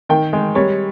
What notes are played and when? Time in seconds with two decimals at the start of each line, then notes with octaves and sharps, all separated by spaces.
0.09 D#3 G5
0.33 G#3
0.55 G3 C#5